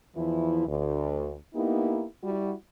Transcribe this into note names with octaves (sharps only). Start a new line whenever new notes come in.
E2 E3 F3 E4
D2
A#3 B3 D#4 E4 G4
G3 E4 F#4